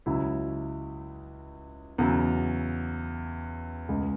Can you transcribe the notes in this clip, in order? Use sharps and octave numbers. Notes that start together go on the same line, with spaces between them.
C#2 C#3 F#3 E4
E2 C#3 F#3
C#2 C#3 G#3